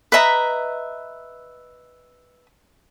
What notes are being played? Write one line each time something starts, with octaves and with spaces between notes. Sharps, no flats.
B4 D#5 E5 A#5